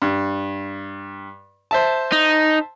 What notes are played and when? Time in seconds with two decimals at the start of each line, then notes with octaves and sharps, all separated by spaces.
0.02 G2
1.71 C5 E5 A5
2.12 D#4